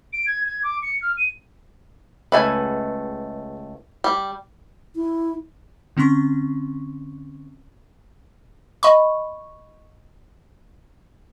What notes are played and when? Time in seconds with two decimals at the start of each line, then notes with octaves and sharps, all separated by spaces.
0.13 D7
0.26 G#6
0.45 G#6
0.63 D6
0.82 C#7
1.02 F6
1.17 D#7
2.32 C#2 A3 B4 E5 G#5
4.04 G3
4.96 E4
5.97 D3 C4 C#4 C6 C#6
8.83 D#5 B5 C#6